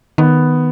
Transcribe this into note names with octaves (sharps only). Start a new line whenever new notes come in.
D#3 B3